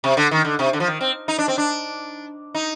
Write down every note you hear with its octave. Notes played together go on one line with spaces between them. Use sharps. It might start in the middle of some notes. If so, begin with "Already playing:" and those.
C3
D3
D#3
D3
C3
D3
F3
D#3
C4
D#4
D4
C4
D4
D#4